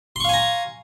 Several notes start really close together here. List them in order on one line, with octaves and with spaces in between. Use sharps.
C6 C#6 F5 G#5 A#5